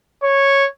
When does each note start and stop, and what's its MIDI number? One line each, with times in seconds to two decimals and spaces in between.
0.24 0.66 73